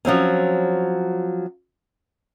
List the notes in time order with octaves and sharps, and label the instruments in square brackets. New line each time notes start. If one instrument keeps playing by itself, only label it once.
[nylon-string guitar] F3 F#3 C4 C#4